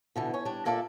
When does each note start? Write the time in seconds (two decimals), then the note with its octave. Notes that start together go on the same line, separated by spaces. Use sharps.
0.16 B2 D3 E3
0.34 C#4 C#5
0.45 G3 D4
0.65 A#2 A#3 A4 D5 E5